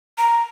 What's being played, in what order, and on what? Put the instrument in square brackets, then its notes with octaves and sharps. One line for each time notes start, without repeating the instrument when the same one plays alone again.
[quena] A#5